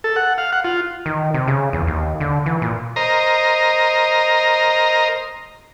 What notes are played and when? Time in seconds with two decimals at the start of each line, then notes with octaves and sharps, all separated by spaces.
0.04 A4
0.16 F#5
0.38 F5
0.53 F#5
0.64 F4
1.06 D#3
1.34 C3
1.48 C#3
1.73 E2
1.87 D#2
2.20 D3
2.46 E3
2.62 A#2
2.96 A#4 C5 D#5 A#5